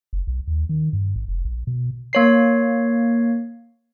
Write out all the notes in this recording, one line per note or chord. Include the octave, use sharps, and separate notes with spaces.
F#1
B1
D#2
D#3
G2
A1
F1
A#1
B2
A#3 C#5 C7